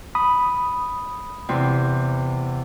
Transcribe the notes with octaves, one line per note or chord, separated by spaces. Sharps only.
B5 D#6
E2 C3 C4